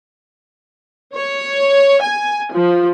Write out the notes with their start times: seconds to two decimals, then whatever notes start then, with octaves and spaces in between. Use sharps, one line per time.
1.15 C#5
2.02 G#5
2.52 F3